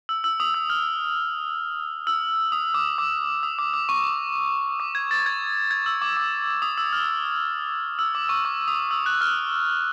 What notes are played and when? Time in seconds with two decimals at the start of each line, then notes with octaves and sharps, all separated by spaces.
0.09 E6
0.24 E6
0.40 D#6
0.54 E6
0.70 F6
2.07 E6
2.52 D#6
2.74 D6
2.98 D6
3.43 D#6
3.59 D6
3.74 D6
3.89 C#6
4.80 D6
4.95 G#6
5.11 A6
5.26 G#6
5.71 G#6
5.86 E6
6.02 D6
6.17 D6
6.62 D#6
6.78 E6
6.93 F6
7.99 E6
8.15 D6
8.29 C#6
8.45 D6
8.68 D#6
8.91 E6
9.06 F#6
9.21 F6